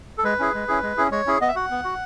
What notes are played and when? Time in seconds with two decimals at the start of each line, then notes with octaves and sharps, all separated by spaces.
0.18 A4
0.24 G#3 B4
0.39 C#4 E4 G#4
0.54 G#3
0.68 C#4 E4 G#4
0.83 G#3
0.97 C#4 E4 G#4
1.11 G#3 C#5
1.27 C#4 E4 G#4
1.41 B3 D#5
1.48 E5
1.56 F#4 F#5
1.71 B3
1.84 F#4